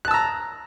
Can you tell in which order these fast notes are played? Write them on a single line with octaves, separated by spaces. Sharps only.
F#6 A5 E6 A#5